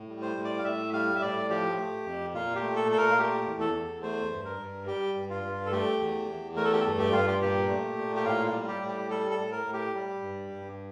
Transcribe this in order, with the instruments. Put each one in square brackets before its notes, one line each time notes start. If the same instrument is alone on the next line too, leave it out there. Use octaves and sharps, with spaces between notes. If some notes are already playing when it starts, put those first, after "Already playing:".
Already playing: [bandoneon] A2
G3
C5
A2
D5
F5
A2 E5
G3 F5
E5
A2 D5
F3 G4
A3
F2
A#2 F4
G4
A3
A4
A#2 A4
A#4
F4
A3 G4
E2
A4
E2
A3 C5
G2
A#4
G2
G3 G4
G2
F4
G2
A4
A3 G4
E2
E2
A3 A#4
A4
G4
G2 A4
G4
G2 F4
G4
A#2 G4
A3
A#2
G4
A2 F4
F4
G3
G4
A2
G4
G3 A4
A4
A2
A#4
A2
G4
G3
G2
G2